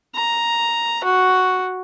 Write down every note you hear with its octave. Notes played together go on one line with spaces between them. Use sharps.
A#5
F#4